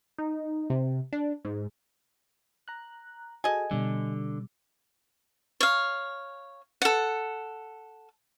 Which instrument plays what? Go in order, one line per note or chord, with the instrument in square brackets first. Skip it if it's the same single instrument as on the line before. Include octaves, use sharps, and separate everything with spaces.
[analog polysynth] D#4
C3
D4
G#2
[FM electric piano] A#5 F#6
[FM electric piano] F#4 G#4 A4 [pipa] D#5 G#5
[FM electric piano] B2 G3 [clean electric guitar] D3
[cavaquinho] C#5 F5
A4 F#5